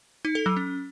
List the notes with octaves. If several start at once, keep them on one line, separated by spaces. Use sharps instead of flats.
D#4
A4
F#3
C#4